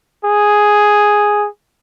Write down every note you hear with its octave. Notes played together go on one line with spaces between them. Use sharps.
G#4